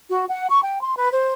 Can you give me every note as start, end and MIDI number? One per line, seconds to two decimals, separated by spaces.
0.10 0.24 66
0.29 0.46 78
0.50 0.61 85
0.63 0.79 79
0.83 0.93 84
0.96 1.10 71
1.11 1.33 72